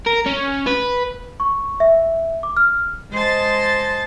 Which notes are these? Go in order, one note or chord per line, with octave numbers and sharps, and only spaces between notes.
A#4
C#4
B4
C#6
E5
D6
F6
G#3 C5 D#5 A5 A6